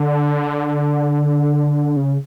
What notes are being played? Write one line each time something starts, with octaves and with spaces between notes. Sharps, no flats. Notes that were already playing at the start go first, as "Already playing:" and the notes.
Already playing: D3
C#3